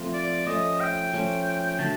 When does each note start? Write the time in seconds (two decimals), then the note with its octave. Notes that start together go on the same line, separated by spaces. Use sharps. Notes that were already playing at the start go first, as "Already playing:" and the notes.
Already playing: F3 A3 C4 F4
0.14 D5
0.46 F3 A3 C#4 D#5
0.81 G5
1.13 F3 A3 C#4
1.79 D3 F#3 A3 A5